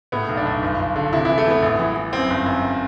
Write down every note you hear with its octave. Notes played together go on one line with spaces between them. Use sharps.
A2 B3
B1
D4
B1
G1
G1
D3
C3 E4
E3 E4
A3
E3 B3
A1
E3
E3
F#2 C4
G1
F#2